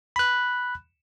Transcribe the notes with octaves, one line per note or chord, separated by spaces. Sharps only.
B5 F#6